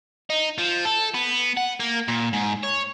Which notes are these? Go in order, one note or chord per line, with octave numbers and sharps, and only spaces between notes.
D#4
F3
A4
B3
F#5
A#3
A#2
G#2
C#5